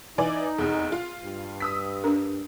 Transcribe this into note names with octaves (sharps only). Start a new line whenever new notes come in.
E3 D#4 D5 G#5
F1 E2 G#4
F4
G2
D#6 E6 B6
D4 A#4